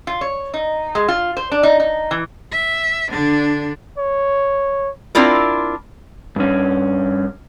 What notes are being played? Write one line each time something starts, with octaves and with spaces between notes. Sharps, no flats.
F4
C#5
D#4
G#3
F4
C5
D4
D#4
D#4
E3
E5
D3 D4
C#5
C4 D4 E4 F4 A#4
G2 C#4